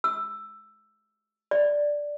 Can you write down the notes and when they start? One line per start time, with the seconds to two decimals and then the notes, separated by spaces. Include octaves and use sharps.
0.04 E6
1.51 D5